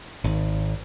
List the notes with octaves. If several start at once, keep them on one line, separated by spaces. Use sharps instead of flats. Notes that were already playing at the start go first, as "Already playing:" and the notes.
G#1